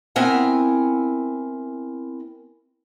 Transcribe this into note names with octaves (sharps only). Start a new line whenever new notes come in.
B3 C4 E4 A#4 F#5 G#5